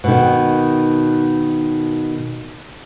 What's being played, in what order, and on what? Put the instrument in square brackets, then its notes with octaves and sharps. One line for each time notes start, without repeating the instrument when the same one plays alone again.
[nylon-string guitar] B2 D#3